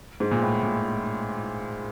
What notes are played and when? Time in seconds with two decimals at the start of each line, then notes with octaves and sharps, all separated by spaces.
0.20 G#2
0.31 A#2
0.42 A2
0.63 A#2